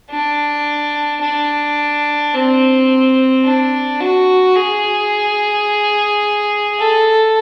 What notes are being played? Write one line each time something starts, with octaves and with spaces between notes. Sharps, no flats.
D4
D4
C4
D4
F#4
G#4
A4